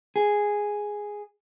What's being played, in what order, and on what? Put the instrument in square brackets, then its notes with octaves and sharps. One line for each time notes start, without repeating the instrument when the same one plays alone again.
[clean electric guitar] G#4